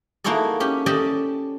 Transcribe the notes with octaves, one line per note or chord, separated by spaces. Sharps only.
A#3 D#4 E4 F#4 G#4 A4
C#4 G4
C#4 G4 A4 D5 D#5 A5